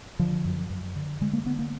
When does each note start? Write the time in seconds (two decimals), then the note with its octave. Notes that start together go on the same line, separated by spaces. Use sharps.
0.19 D3 F3
0.45 F#2
0.70 F#2
0.96 D3
1.21 D3 G#3
1.33 A#3
1.46 D3 B3
1.59 A#3